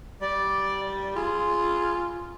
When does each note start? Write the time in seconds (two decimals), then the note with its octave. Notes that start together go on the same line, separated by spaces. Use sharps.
0.22 G3 D5
1.16 F4 G#4